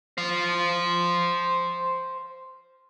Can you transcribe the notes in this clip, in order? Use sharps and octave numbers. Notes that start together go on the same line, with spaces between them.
C5 F5